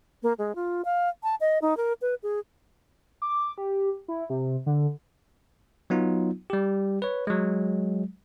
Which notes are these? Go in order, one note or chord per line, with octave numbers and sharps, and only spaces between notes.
A#3
G#3
F4
F5
A5
D#5
D#4
A#4
B4
G#4
D6
G4
E4
C3
D3
F#3 B3 D#4 F4
G3 G4
B4 C#5
F#3 G#3